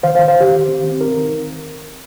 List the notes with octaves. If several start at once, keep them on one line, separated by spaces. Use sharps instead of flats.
D#3 C5 F5
D#3 C5 F5
C5 F5
D#3 G4
D#3
C4
C4
D#4 A#4
D#3